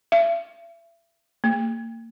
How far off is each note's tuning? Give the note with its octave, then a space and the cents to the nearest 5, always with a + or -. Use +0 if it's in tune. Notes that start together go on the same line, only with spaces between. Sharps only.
E5 +30
A#3 -30